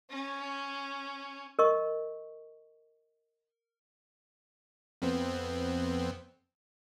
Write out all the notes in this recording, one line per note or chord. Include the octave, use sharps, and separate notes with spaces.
C#4
A#4 D#5 C#6
F2 B3 C4